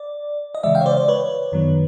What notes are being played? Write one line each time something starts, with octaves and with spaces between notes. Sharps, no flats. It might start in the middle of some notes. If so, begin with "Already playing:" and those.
Already playing: D5
D#5
C#3 E3 G#3 D5 E5
F5 G5
C#5
C5 D5
C5 D5
B4 C#5
F#2 D#3 F#3 B3